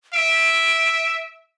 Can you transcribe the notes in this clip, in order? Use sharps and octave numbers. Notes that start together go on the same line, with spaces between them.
E5 D7